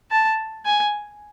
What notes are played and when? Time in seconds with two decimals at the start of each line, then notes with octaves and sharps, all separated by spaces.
0.11 A5
0.66 G#5